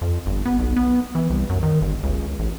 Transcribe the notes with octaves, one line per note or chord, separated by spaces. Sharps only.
F2
G1
B3
B1
B3
E3
C2
F#2
D#3
G1
C#2
A1